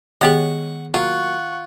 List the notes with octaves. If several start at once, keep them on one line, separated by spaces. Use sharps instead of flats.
D#3 G#3 B3 G4 G#4 C#5 F#5 C#6
F#3 A#3 F4 F#5 C#6